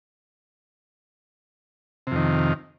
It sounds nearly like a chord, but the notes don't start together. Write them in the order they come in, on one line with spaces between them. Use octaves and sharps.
C3 F2 D#3